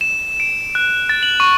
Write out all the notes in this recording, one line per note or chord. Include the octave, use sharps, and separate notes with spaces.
E7
D7
F#6
A6
F#7
C#6